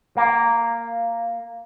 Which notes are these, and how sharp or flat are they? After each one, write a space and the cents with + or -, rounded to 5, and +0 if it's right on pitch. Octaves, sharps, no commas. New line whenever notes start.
A#3 -5